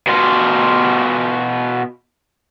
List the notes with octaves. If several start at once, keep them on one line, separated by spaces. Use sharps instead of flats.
B2 F4